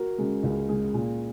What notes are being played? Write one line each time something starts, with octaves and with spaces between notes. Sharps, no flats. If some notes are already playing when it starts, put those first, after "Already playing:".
Already playing: F#4 A#4
C#3 G#3
C#2
C#3 G#3 G#4
A#2